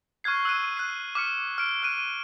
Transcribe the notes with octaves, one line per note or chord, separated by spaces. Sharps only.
C#6 F6 F#6 G#6 C7
E6 F#6 D#7
F#6 C7
D6 F6 C#7
F6 D7
F6 F#6 D#7